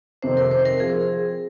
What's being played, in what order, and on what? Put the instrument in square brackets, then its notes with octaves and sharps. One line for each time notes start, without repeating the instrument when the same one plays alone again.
[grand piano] F2 C3 D#3 C4 D#4 [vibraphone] C5
[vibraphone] A#4
C5
A#4
[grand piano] F3 C4 F4 [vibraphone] G#4